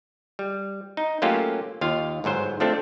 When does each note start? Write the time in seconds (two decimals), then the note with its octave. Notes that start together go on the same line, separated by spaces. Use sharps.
0.39 G3
0.97 D#4
1.22 F#3 A3 A#3 C#4 F4 G4
1.81 D#2 F4 F5
2.24 G1 G#2 F#3 C5
2.60 F3 A3 C4 D4 A4